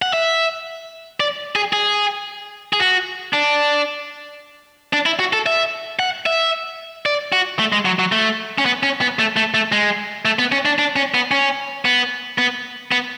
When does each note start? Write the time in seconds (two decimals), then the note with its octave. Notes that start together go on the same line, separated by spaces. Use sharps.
0.02 F#5
0.13 E5
1.20 D5
1.56 G#4
1.73 G#4
2.73 G#4
2.80 F#4
3.33 D4
4.93 D4
5.06 E4
5.19 F#4
5.33 A4
5.46 E5
5.99 F#5
6.26 E5
7.06 D5
7.32 F#4
7.59 A3
7.72 G#3
7.85 F#3
7.99 F#3
8.12 A3
8.58 C#4
8.66 B3
8.83 C#4
9.01 B3
9.19 A3
9.36 A3
9.54 A3
9.72 G#3
10.25 A3
10.39 B3
10.52 C#4
10.65 D4
10.79 D4
10.96 C#4
11.14 B3
11.31 C#4
11.85 B3
12.38 B3
12.92 B3